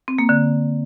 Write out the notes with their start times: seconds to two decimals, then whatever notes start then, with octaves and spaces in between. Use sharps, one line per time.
0.08 C4
0.18 A#3
0.29 D3